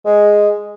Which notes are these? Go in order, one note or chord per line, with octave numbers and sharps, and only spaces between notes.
G#3